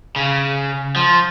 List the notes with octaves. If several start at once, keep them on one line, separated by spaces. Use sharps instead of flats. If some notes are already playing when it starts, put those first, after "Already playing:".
C#3
F3